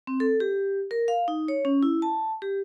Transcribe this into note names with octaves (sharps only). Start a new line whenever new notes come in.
C4
A4
G4
A#4
F5
D#4
C#5
C#4
E4
A5
G4